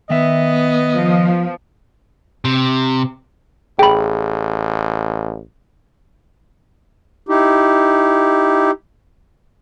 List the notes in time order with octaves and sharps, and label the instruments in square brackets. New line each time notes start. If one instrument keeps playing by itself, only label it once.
[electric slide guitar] D#3 E5 [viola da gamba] B3 [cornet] D#5
[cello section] F3
[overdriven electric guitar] C3
[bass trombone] A1 [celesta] G#4 [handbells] G5 B5
[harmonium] D#4 E4 G4